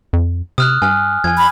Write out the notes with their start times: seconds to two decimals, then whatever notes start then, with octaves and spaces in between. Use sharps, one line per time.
0.13 F2
0.58 C3 D#6 F6 F#6
0.82 G2 G#5 F6
1.24 F2 G#5 G#6
1.38 B5